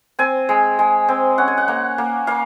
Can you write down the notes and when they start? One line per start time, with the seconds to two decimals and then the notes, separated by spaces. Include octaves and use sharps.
0.19 C4 G#5
0.49 G#3
0.79 G#3
1.08 C4
1.38 C#4 F#5
1.48 G#5
1.57 F#5
1.68 A#3 F#5
1.98 A#3
2.27 A#3 F5